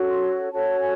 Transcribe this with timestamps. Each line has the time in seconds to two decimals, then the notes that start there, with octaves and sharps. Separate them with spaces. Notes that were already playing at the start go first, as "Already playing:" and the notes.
Already playing: C#4 F#4 A4 C#5
0.10 C6
0.52 C#4 F#4 A4 C#5 A5
0.80 G#5